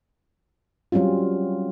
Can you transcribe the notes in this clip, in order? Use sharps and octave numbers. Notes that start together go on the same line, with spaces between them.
F#3 G3 C4 C#4 F4